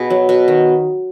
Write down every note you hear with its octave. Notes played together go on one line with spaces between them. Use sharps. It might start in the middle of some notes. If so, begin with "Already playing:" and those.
Already playing: B2 B3 G#4 B4
F#3
B2
D#3